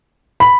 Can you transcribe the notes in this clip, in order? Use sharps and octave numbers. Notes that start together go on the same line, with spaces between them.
B5